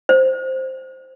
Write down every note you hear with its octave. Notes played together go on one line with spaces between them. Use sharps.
C5